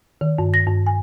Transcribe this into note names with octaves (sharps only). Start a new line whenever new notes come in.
D#3
G2
A#6
G2
G#5